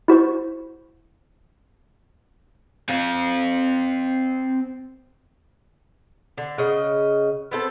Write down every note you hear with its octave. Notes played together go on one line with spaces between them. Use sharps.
E4 F#4 C5 C#6
C4 F5
D3
C#3 C#4 D#5 F#5
B3 C4 A4